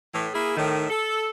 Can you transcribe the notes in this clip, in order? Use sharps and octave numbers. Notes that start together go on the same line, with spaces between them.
A2 E3
A#3 E4 G#4
A2 D#3
A4